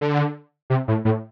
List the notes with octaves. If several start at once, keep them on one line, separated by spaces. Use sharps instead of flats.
D3
C3
A2
A2